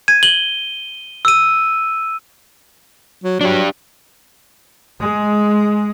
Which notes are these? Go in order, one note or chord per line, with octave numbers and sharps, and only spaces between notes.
G#6 D#7
F#7 G7
E6 D#7
F#3
F#3 D4 G4
G#3